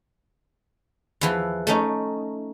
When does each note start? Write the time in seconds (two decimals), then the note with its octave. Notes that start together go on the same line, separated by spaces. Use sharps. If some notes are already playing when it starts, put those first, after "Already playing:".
1.21 E2 E3 F3
1.67 A3 C#4 D#4